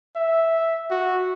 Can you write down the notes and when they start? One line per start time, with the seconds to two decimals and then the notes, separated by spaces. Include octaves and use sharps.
0.16 E5
0.91 F#4